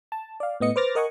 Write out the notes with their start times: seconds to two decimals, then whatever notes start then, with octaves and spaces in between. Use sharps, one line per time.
0.12 A5
0.40 D5 F5
0.60 A2 B3 D#5 C#7
0.76 B4 C5 D6 F6 A6 A#6
0.95 A#4 D#5 F#5 G#5 C#6